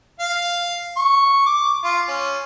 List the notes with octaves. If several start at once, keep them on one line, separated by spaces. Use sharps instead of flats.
F5
C#6
D6
F4
C#4